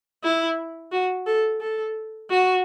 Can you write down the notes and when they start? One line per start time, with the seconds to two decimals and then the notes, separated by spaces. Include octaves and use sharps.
0.24 E4
0.92 F#4
1.27 A4
1.60 A4
2.30 F#4